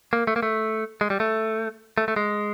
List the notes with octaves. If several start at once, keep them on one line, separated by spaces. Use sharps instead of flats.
A#3
A3
A#3
A3
G#3
G3
A3
A3
A3
G#3